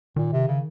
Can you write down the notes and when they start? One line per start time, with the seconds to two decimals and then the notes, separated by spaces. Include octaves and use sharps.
0.16 A#2 D#3
0.32 C3
0.48 C#3